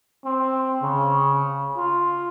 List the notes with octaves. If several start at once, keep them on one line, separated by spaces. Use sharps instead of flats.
C4
C#3
F4